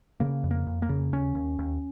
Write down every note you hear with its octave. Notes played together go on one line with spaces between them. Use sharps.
C#3 A#3
F2
A#3
F2
A#3
C#3
D#2 C#4
D#2
D#2